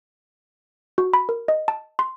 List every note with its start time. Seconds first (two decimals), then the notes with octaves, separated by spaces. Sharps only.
0.98 F#4
1.14 B5
1.29 A#4
1.48 D#5
1.68 A5
1.99 C6